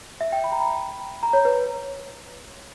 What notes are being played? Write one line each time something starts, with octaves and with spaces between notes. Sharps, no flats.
E5
G5
B5
A#5
B5
A#5
C#5
B4